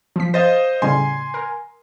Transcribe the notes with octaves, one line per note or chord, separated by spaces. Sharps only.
F3 B6
C5 D#5 F5 A6
A2 C#3 G3 G#5 C6
A#4